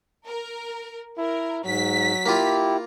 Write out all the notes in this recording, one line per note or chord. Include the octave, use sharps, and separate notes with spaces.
A#4
E4 A#4
G#2 F#3 B6
A#3 E4 F4 G4